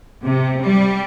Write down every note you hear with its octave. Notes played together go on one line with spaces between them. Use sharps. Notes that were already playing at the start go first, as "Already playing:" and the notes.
C3
G3